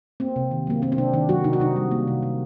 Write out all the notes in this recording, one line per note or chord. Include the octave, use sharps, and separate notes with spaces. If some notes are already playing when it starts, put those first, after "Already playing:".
A#3 C4
C3
D#3
F#3 A#3
A#3 C4
C4
C3 D4
D#3 D4
F#3 F#4
C3 D#4
F#4
C3 D#4
G3
A#3
C3
C3